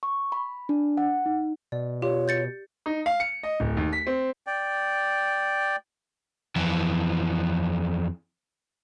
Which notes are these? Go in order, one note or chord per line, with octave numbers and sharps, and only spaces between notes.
C#6
B5
D4
F#5
D#4
B2 D5
F4 G4 C#5
G6 A6 C#7
D#4
F5
C#7
D#5
D1
D#2
B6
C4
D5 G5
F2 E3